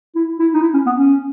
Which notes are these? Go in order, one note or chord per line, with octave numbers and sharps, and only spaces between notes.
E4
E4
D#4
E4
C#4
B3
C#4